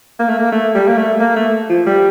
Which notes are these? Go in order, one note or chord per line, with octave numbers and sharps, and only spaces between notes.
A#3
A3
A#3
A3
G3
A#3
A3
A#3
A3
F3
G3